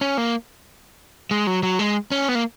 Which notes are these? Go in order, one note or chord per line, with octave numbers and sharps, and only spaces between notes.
C#4
A#3
G#3
F#3
F#3
G#3
C#4
B3
A#3